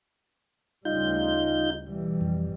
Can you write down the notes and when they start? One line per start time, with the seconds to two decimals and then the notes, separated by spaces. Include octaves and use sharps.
0.85 D2 C#3 G3 D#4 F4 G6
1.87 B2 E3 G3
2.21 F2